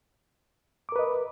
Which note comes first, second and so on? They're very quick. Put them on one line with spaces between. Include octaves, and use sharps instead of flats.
D6 A#4 B4 D#5